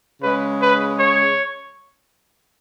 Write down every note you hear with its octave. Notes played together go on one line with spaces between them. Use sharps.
C#3 G#3 B4
B4
C#5